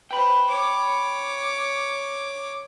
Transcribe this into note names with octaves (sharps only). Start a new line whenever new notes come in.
B4 C5 G5 B5
C#5 D6